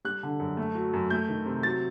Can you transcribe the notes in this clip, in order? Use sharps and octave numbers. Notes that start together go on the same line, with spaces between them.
G3 F#6
D3
F#2
A3
F#3
F#2
A3 G6
D#3
C3
F#3 A6